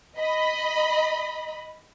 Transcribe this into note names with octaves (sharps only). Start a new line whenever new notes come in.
D#5 B5